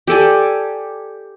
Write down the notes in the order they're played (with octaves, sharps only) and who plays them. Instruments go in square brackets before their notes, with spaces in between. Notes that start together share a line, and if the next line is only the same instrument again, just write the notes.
[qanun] G4 A4 D5 G#5